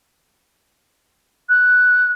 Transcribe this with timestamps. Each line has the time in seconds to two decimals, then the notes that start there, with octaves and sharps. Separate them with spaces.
1.49 F#6